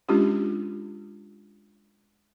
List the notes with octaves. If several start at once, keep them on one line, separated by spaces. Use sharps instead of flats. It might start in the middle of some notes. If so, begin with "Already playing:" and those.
G#3 C#4 D4 F4 G4